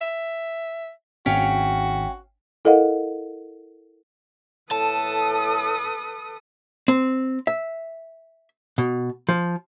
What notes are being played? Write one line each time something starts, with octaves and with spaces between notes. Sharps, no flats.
E5
G#1 C#4 F#4 F5 G5 B6
E4 A4 A#4 D#5 F5 F#5
A2 A4 B4 A5 D#6
C4
E5
B2
F3